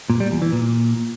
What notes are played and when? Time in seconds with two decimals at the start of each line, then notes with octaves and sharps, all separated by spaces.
0.10 A#2
0.20 G3
0.31 E2
0.42 E3
0.52 A#2